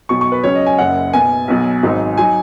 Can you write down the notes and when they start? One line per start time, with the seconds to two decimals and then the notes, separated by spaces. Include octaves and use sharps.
0.09 B1 B2 F#3 C#6
0.21 C#6
0.32 B4
0.44 C#2 C#3 F#3 C#4 C#5
0.55 D#5
0.66 G#5
0.78 F#1 F#2 C#3 F#5
1.13 B1 B2 B3 G#5
1.48 B1 B2 F#3
1.83 G#1 G#2 F#3 D#4
2.17 F#3 D#4 G#5